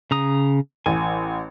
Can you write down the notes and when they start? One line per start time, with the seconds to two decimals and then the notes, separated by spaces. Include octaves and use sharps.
0.11 C#3 A#5 D#6
0.86 A1 G#5